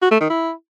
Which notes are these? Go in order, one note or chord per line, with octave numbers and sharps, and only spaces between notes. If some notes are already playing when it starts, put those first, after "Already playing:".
F#4
A3
D#3
E4